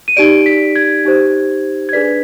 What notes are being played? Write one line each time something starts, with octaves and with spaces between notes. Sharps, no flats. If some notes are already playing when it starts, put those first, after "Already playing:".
D#7
D#4 G4 D5 D7
B6
G#6
D#4 G4 C5
G#6
D4 G#4 B4 D5 B6